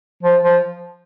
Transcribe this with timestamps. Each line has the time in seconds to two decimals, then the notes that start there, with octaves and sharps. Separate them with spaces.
0.23 F3
0.43 F3